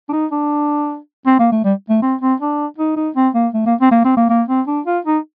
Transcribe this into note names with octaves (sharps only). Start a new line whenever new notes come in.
D4
D#4
D4
C4
A#3
A3
G3
A3
C4
C4
D4
D#4
D#4
C4
A#3
A3
A#3
C4
A#3
C4
A#3
A#3
C4
D4
F4
D#4